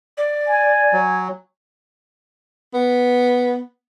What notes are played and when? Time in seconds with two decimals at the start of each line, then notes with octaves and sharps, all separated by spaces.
0.17 D5
0.47 G#5
0.93 F#3
2.74 B3